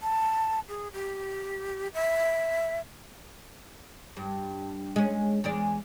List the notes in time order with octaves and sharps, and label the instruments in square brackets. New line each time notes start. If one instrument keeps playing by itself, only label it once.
[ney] A5
G#4
G4
E5
[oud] G2
G#3 C#4
E2 G#3 D5